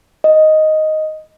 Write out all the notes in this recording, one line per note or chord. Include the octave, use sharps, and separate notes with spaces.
D#5